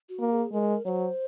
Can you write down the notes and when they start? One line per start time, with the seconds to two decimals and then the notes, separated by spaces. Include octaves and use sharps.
0.09 F#4
0.20 A#3
0.31 G#4
0.53 G#3 A#4
0.85 F#3 C5 C#5